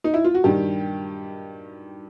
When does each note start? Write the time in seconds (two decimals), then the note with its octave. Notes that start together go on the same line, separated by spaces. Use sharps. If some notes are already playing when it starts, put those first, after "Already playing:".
0.04 D#4
0.14 E4
0.24 F4
0.34 F#4
0.44 G2 D#3 G4